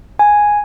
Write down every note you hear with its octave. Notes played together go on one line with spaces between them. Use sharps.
G#5